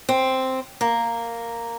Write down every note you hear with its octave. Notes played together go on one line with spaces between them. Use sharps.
C4
A#3